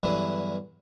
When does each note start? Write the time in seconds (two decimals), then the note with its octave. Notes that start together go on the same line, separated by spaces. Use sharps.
0.03 E2 G2 D3 E3 F#3 E4